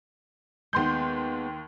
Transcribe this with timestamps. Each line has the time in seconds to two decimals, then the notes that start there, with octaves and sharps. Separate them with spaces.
0.73 D#2 G#3 B3 C6 G6